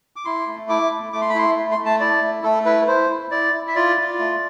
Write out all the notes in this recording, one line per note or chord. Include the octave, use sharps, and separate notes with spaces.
D6
E4 C6
A3
E4 D6
A3
A3 D6
C6
B5
E4 C6
A3
C6
A3
A5
E4 D5
A3
A3 A4
E4 B4
E4 C5
E4
E4 D5
E4
E5
F4 D5
F4
A3